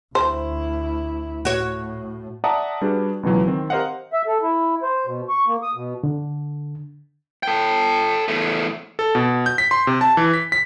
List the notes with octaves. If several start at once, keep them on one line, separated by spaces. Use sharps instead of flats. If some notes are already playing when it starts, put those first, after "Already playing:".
D2 E4 C5
A2 F#4 C#5
D5 E5 F#5 A5 A#5 D#6
G3 D4 F#4 G#4 B4
C#2 B2 E3 F#3
D#3 C4
G4 A#4 C5 D#5 F5 F#5
E5
A4
E4
C5
B2
C#6
A#3
D#6
B2
D3
A4 G5
E2 A3
A4
B2
G6
B6
C6
C3
A5
E3
B6
B6